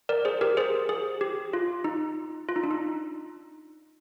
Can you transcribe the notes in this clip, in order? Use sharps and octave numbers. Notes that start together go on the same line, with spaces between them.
A#4 D5
G#4 C5
G4 A#4
G#4 C5
G#4
G4
F4
D#4
F4
D#4
D4
D#4